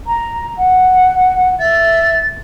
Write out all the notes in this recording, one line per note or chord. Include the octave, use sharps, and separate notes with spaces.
A#5
F#5
E5 A6